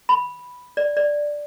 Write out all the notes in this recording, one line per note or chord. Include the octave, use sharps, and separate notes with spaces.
B5
D5
D5